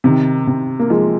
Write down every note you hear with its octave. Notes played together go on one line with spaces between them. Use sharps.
C3 D#3
C3
A#3
F3 G#3